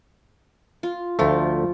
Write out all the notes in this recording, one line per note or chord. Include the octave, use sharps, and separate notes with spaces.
F4
D2 F3 A3 F4